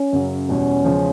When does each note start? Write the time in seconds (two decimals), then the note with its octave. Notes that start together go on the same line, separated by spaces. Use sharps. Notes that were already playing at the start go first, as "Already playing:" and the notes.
Already playing: C#4
0.13 F#2 C#3 F#3
0.48 E2 B2 G3 C#4
0.85 E2 C#3 F3 G#3